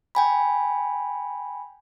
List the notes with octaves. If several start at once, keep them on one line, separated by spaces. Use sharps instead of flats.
G5 G#5 B5